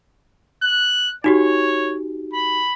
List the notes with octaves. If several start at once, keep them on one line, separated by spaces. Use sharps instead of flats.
F#6
D#4 F#4 G4 C#5
B5